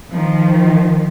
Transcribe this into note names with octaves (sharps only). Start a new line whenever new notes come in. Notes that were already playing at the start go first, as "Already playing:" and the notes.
D#3 F3